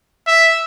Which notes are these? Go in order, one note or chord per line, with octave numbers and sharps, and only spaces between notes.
E5